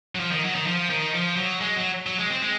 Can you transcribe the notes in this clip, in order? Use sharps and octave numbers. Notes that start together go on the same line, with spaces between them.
F#3
F3
D#3
F#3
D#3
F3
D#3
F3
F#3
G#3
F#3
F#3
G#3
C4
G#3